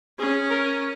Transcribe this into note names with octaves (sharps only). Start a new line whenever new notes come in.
C#4 G#4
A#4